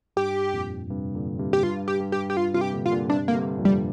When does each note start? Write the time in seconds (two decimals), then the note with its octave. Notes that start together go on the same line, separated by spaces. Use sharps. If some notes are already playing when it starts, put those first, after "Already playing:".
0.17 G2 G4
0.53 F2 A#2
0.90 G2 C3
1.14 A#2 D3
1.39 G2 C3
1.53 G4
1.63 G2 F4
1.88 G4
2.00 G2
2.12 G4
2.30 G4
2.37 G2 F4
2.54 G2 C3 F4
2.61 G4
2.73 A#2 D3
2.86 F4
2.91 A#2 D3
3.09 G2 C3 D4
3.28 D3 A#3
3.34 G2 C3
3.58 F2 A#2
3.65 G3